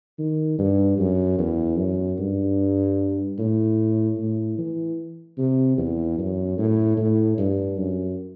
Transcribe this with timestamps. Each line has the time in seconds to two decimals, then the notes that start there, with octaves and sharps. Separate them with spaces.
0.19 D#3
0.58 G2
0.98 F#2
1.39 E2
1.78 F#2
2.19 G2
3.39 A2
4.17 A2
4.58 E3
5.38 C3
5.78 E2
6.18 F#2
6.58 A2
6.97 A2
7.38 G2
7.77 F#2